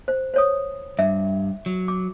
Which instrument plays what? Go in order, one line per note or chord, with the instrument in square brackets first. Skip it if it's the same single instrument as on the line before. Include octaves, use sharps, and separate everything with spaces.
[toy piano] C5
C5 C#5 D#6
[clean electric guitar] G2 [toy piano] E5
[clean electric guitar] F#3
[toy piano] D6